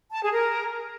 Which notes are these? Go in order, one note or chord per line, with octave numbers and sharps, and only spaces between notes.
A5
G#4
A#4